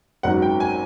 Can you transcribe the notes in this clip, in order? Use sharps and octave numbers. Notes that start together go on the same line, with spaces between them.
G#1 F#2 D#3 F#3 F#5
G5
G#5